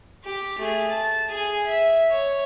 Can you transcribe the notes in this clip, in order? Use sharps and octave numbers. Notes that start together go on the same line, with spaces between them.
G4
A3 G#4
A5
G#4 G#5
E5
C#5